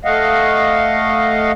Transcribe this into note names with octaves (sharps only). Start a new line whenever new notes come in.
A3 D#5 F5 F#5